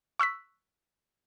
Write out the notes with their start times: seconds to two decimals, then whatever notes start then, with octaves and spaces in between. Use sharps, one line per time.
0.19 C#6 E6 F#6 B6